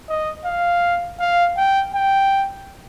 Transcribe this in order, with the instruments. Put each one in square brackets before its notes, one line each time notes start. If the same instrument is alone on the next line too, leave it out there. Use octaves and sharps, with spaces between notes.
[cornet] D#5
F5
F5
G5
G5